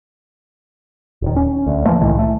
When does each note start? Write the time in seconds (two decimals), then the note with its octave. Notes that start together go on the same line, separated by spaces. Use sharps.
1.22 D#1 D#3
1.36 C#4
1.66 D2
1.85 E3 F3 A3 A#3
2.01 C2 A2 D#3 E3
2.19 A3